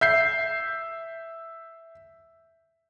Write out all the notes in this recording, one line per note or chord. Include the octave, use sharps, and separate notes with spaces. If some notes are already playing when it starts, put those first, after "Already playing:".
E5 G6 C7